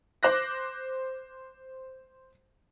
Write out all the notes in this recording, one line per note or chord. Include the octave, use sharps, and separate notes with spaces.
C5 D6 F#6 A#6